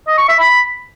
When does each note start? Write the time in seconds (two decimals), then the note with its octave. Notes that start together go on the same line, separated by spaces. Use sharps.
0.07 D#5
0.18 C#6
0.29 E5
0.39 B5